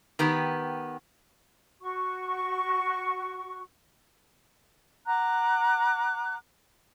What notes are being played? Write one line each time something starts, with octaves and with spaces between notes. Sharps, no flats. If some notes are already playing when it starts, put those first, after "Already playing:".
D#3 B3 G4
F#4 C#6
F#5 A#5 D6 F#6